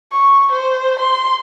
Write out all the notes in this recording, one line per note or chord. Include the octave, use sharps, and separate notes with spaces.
C#6
C5
C6